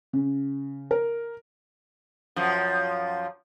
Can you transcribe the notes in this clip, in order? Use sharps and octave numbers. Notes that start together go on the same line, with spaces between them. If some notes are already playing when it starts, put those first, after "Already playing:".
C#3
A#4
F#2 F3